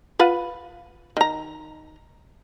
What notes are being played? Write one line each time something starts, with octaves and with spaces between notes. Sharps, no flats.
F4 B4 F#5
D#3 A#5